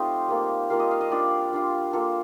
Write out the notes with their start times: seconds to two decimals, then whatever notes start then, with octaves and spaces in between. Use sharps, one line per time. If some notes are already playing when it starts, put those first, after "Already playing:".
Already playing: A3 C4 D#4 F4 G4 C5 D#5
0.28 G3 A#3 F4
0.70 G3 A#3 F4 F5
0.80 D#5
0.91 F5
1.01 D#5
1.10 G3 D4 F4 D5
1.53 G3 D4 F4
1.93 A#3 F4 A4